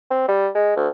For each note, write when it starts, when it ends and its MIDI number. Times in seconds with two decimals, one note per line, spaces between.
0.11 0.25 60
0.28 0.49 55
0.55 0.72 56
0.76 0.88 38